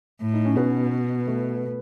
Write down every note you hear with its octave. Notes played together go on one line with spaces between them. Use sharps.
A2
D#4
C#4
B2 B3
A3